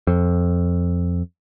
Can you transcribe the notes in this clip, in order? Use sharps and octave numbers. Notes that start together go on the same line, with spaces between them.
F2